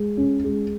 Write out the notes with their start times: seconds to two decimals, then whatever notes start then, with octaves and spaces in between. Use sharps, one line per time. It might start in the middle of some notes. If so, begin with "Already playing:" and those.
Already playing: G#3
0.17 C#4
0.44 G#3